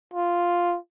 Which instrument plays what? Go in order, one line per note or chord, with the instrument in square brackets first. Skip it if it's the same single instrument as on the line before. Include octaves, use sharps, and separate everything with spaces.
[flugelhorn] F4